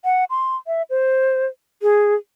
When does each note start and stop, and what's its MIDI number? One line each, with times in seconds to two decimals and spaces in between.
0.05 0.24 78
0.30 0.56 84
0.67 0.82 76
0.90 1.46 72
1.82 2.15 68